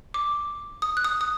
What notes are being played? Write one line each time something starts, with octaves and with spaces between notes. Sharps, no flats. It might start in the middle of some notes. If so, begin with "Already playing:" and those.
D6
D#6
F#6
D#6
D#6